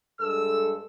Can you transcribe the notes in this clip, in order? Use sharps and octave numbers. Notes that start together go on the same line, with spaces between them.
G2 G#3 A4 E6